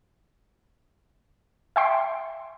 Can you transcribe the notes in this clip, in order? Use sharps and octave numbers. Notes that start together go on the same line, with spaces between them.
E5 G5 C6